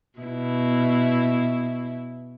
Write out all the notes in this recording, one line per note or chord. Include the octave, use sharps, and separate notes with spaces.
B2 E4